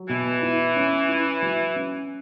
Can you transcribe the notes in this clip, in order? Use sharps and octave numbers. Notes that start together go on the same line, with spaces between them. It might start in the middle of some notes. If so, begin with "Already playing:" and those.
Already playing: F#3
B2 E3
E4
C#4
E4
F#3
C#4